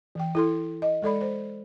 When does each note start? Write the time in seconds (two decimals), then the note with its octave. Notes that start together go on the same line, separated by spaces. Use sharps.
0.15 E3 G5
0.35 E4 A4 C6
0.82 D#5
1.02 G#3 A4 D5 B5
1.21 C5